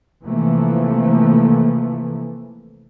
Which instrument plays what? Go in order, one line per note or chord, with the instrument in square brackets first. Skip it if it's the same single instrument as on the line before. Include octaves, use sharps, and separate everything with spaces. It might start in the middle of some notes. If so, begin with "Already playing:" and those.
[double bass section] C3 E3 F3 A3 A#3